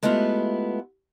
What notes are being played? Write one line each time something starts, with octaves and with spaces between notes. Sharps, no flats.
G#3 A3 B3 E4 F4 G4